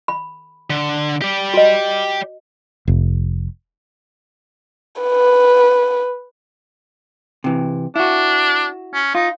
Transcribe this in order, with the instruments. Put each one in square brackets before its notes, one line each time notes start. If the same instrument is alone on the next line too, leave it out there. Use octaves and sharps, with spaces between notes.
[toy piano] B5
[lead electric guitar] D3
G4 D5
[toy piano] F#4 D#5
[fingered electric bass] F1
[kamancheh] B4
[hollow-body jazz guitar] C3 E3
[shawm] D4 [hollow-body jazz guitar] E4 F#4
[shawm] C#4
[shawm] D#4 [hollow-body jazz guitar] F4